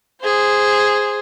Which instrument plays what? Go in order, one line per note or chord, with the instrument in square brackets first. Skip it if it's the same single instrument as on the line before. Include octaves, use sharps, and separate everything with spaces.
[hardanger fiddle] G#4 C5